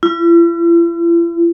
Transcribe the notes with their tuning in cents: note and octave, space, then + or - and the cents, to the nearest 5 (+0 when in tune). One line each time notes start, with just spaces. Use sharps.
E4 +45